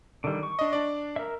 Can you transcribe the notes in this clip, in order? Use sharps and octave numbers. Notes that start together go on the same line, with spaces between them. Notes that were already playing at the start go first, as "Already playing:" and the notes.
D3 D#3 G3
C#6
D4 D#5
D4 D5
A#4 E5